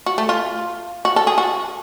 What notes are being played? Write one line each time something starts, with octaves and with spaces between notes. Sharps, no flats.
F#4
A3
F4
F#4
A4
G#4
F#4